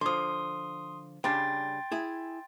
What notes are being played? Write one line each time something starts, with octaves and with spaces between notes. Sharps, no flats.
D3 F3 C6 D#6
C#3 G3 D4 G5 C6 A6
E4 G#4